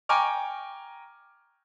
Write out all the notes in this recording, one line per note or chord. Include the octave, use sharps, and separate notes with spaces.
G5 G#5 A#5 C#6 D6 F6